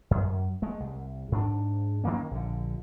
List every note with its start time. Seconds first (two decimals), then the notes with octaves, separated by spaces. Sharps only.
0.11 F#2
0.62 G#3 A3
0.80 C2
1.32 G#2 D4
2.04 D#3 F#3 A#3 C#4
2.31 A#1 D3